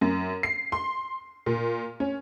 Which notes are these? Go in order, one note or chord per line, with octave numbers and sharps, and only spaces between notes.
F#2
C7
C6
A#2
C#4